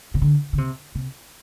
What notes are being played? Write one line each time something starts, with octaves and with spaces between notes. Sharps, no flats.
C3
D3
D3
C3
C3